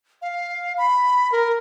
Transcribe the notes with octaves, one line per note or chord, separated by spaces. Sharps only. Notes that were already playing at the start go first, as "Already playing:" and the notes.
F5
B5
A#4